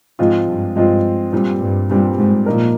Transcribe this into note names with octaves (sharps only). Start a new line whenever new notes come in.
G#2 F3 G#3 C4 F4
G2
G2 F3 G#3 C4 F4
G2 A#2 G3 C4
G2
G2 A#2 G3 C4
G#2
A#2 F3 A#3 D#4 A#4